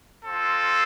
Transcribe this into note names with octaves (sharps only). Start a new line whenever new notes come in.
C4 F4 A4